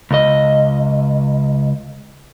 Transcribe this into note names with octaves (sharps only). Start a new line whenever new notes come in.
C#2 D#5